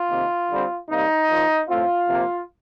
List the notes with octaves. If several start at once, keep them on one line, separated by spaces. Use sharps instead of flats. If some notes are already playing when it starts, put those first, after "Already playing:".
Already playing: F4
C3 D#3 A#3
D3 G3 C4
C3 G3 A#3 D#4
A#2 F3 A#3
A2 A3 C4 F4
C3 F3 A#3